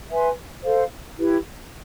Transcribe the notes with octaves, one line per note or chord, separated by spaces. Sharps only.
B4 E5 G#5 C6
A4 C5 F5
E4 G4 B4